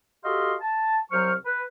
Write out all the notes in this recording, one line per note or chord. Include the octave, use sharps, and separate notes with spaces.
F#4 G4 A4 D#5 F5 C6
A5
C2 F#3 C5 C#6 F6
B4